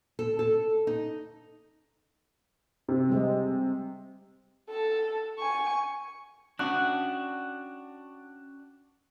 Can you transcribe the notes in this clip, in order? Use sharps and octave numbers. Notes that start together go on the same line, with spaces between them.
A4
A4
D#4
C3
G3 G#3
A4
G#5 C#6
C#4 D4 F#4 F#6